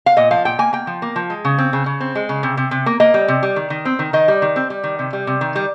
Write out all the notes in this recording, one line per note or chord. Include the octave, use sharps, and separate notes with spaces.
F5
A#2 D#5
F3 F5
A#2 G5
A#3 G#5
A#3 G5
F3
A#3
F3
G#3
C#3
C4
C#3
C#3
C4
G#3
C#3
C3
C3
C3
A#3
A#3 D#5
G3
C3
G3
D#3
D#3
C4
D#3
D#3 D#5
G3
D#3
C4
G3
D#3
C3
G3
C3
D#3
G3